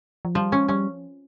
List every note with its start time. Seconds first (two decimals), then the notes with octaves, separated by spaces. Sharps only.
0.25 F3
0.35 F3 G3
0.52 G#3 C#4
0.68 G3 C#4